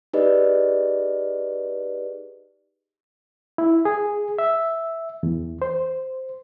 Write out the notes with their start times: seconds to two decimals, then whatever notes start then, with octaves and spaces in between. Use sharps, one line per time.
0.13 D#4 G4 G#4 B4 D5 D#5
3.58 E4
3.85 G#4
4.39 E5
5.23 E2
5.62 C5